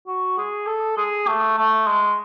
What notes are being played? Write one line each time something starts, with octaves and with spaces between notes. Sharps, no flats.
F#4
G#4
A4
G#4
A3
A3
G#3